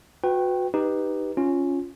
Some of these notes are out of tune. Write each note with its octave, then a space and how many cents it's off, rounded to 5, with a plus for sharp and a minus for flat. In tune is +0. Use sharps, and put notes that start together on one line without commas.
F#4 -25 B4 +20 G5 -5
D#4 +0 G4 +0 B4 +0
C#4 +0 F4 +0